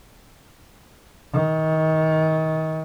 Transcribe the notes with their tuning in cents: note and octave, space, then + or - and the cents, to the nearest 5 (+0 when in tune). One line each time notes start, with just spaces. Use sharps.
D#3 +30